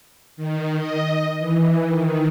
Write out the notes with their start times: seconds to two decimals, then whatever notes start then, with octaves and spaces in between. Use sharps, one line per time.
0.37 D#3
0.78 D#5
1.39 E3
1.86 D#3